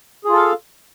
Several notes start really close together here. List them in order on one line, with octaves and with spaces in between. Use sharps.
G#4 F4 A4 F5